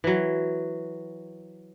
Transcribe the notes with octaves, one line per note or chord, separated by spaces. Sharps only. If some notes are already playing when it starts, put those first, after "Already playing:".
E3 F#3